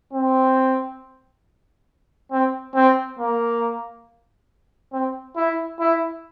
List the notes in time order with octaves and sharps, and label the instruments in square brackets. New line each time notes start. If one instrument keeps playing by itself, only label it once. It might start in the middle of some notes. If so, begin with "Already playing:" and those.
[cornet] C4
C4
C4
A#3
C4
E4
E4